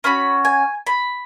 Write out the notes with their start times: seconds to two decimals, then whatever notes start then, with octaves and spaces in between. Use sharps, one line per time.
0.04 C#4 F#4 B5
0.45 G#5
0.87 B5